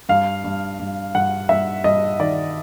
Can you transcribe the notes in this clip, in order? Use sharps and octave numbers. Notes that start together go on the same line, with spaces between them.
G2 F5
G2
G2
G2 F#5
G2 E5
G2 D#5
D#3 D5